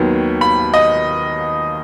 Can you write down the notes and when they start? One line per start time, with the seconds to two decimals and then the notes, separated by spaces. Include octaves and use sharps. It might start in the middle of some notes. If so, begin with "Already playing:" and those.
Already playing: D#2 D#3 F#3 B3
0.41 B5
0.74 D#5